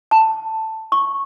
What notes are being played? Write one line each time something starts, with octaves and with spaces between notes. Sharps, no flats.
A5
C#6